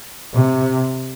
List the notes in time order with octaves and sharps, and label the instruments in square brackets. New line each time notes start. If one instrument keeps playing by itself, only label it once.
[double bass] C3